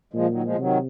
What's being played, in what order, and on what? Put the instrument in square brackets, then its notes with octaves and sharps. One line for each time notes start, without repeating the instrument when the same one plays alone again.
[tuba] A#2 [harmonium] F3 G#3
[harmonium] D#3 F#3
F3 G#3
[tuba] C3 [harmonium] D#3 F#3